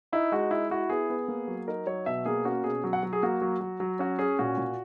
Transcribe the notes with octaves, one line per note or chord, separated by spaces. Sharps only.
D#4 E4
G#3 F#4
E4
E4 F#4
B3 G#4
B3
A#3
F#3
D#4 A#4
F#3 C#5
B2 E5
A#3 G#4
C#4 F#4
B2 G#4
F#3
F#5
F#3
G#4
A#3 F#4
F#3
F#3
F#3
C#4 F#4
C#4 G#4
A#2 F#4
A#2